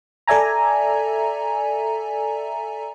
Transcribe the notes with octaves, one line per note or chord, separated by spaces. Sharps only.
A4 D5 E5 G#5 A#5